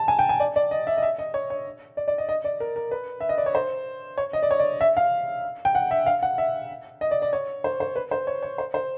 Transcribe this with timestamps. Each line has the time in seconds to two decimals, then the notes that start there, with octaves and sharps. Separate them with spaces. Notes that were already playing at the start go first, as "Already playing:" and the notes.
Already playing: A5
0.08 G#5
0.19 G5
0.29 G#5
0.40 D5
0.56 D5
0.71 D#5
0.87 E5
0.98 D#5
1.02 E5
1.18 D#5
1.34 C#5
1.50 C#5
1.97 D5
2.08 D5
2.18 D#5
2.29 D#5
2.44 D5
2.60 A#4
2.76 A#4
2.91 B4
3.20 E5
3.29 D#5
3.38 D5
3.46 C#5
3.55 C5
4.18 C#5
4.33 D#5
4.43 D5
4.51 C#5
4.59 D5
4.81 E5
4.97 F5
5.65 G5
5.75 F#5
5.91 E5
6.06 F5
6.23 F#5
6.38 E5
7.01 D#5
7.11 D5
7.22 D5
7.33 C#5
7.64 C5
7.80 C5
7.96 B4
8.11 C5
8.27 C#5
8.43 C#5
8.58 C5
8.74 C5